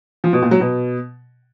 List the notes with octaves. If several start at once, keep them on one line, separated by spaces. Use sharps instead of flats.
F3
B2
A#2
F#3
B2